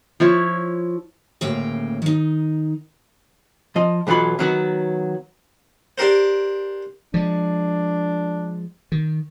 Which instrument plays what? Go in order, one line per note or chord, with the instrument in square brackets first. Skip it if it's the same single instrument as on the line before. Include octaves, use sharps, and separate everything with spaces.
[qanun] F3 E4 C#5
[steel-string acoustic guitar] D2 A2 C#3 A#3 G5
D#3 D#4
[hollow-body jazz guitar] F3 D#5
B1 E3 F#3 F4 B5
D#3 F#3 B3
[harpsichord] D4 G4 A#4 C5
[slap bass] F3 G#3 [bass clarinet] D4
[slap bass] D#3